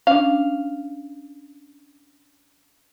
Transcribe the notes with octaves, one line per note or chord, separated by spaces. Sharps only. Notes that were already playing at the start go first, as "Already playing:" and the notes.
C#4 D4 F5